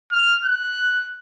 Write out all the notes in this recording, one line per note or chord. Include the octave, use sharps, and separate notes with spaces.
F6
F#6